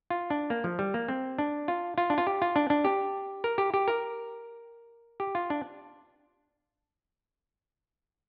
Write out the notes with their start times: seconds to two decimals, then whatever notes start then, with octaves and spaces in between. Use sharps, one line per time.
0.10 F4
0.30 D4
0.50 A#3
0.64 F3
0.79 G3
0.94 A#3
1.08 C4
1.38 D4
1.68 F4
1.98 F4
2.10 D4
2.18 F4
2.27 G4
2.42 F4
2.56 D4
2.70 D4
2.85 G4
3.44 A#4
3.58 G4
3.74 G4
3.88 A#4
5.20 G4
5.35 F4
5.50 D4